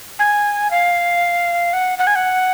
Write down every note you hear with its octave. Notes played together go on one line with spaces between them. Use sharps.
G#5
F5
F#5
F#5
G#5
F#5